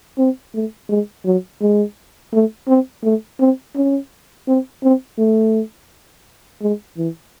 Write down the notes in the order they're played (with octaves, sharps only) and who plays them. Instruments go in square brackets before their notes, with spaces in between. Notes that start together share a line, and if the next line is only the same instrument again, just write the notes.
[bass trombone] C4
A3
G#3
F#3
G#3
A3
C4
A3
C4
C#4
C4
C4
A3
G#3
E3